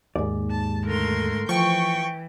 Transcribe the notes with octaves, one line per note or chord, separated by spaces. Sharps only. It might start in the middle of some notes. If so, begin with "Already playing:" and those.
D#2 G#2 D5
A5
D3 A3 A#4 C6
E3 F3 G5 C#6